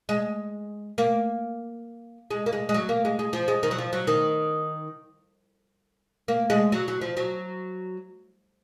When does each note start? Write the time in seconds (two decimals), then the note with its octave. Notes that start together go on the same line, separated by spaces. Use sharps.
0.09 G#3
0.98 A#3
2.31 G#3
2.46 A#3
2.53 G#3
2.69 G#3
2.74 F#3
2.89 A#3
3.05 G#3
3.19 G#3
3.33 F3
3.48 G#3
3.63 D#3
3.71 F#3
3.78 F3
3.93 F#3
4.07 D#3
6.28 A#3
6.50 G#3
6.72 F#3
6.88 F#3
7.01 F3
7.17 F#3